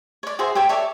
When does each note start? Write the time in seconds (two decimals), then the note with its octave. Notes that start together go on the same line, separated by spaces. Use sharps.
0.23 C#5 D5
0.39 F#4 G#4 C5 E5
0.55 G4 A4 C#5 G5
0.69 A4 C#5 D5 E5